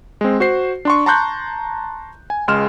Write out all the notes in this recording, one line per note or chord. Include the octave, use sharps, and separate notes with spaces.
G#3 C4
F#4 C5 C7
D4 C6 C#6
A5 A#5 C6 C#6 F#6 G6
G#5
C#2 G#3 C6 F6 E7